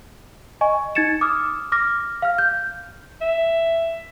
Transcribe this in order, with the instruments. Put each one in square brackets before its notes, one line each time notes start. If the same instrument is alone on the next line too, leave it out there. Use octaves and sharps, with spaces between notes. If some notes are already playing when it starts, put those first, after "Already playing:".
[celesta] D#5 G#5 C#6
D#4 G#6 A6 C#7 E7
D6 D#6 F6
D6 F6 A#6
F5 F6
G6
[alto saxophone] E5